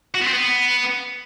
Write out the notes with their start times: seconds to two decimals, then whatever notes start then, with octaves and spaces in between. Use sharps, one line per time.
0.14 F#4
0.21 B3
0.27 C4
0.33 B3